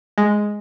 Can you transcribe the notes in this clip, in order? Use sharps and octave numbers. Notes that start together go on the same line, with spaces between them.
G#3